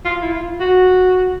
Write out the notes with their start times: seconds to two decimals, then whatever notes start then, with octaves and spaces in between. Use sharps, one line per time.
0.05 F4
0.22 E4
0.32 F4
0.60 F#4